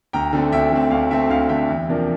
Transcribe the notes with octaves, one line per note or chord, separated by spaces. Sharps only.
D2 G5 A#5
D3 A3 C4
D2 E5 G5
D3 A3 C4
D2 F5
D3 A3 C4 E5
D2 F5
D3 A3 C4 E5 G5
E2
C3 F3 A#3 D4